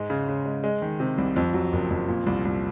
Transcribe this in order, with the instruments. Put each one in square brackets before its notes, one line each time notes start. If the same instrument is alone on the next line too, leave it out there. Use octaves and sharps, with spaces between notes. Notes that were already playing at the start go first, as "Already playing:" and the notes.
Already playing: [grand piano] G#2 G#3
C#3
C#3
G#3
G#3
D#3
C3
C2
F2
F#3
F#1
F2
A#2
C2
C2